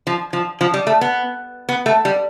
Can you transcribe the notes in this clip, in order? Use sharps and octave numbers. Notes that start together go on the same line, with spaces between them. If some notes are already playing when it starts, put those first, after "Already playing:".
F3
F3
F3
G3
A3
B3
B3
A3
G3